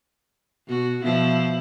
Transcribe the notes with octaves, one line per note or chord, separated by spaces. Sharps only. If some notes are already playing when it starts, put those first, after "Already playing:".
B2 F#4
B2 F3 E4